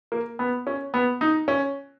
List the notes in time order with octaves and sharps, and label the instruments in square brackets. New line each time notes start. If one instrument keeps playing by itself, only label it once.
[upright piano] A#3
B3
C#4
B3
D#4
C#4